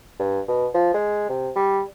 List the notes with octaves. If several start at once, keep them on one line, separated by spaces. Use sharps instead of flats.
G2
B2
F3
G#3
C3
G3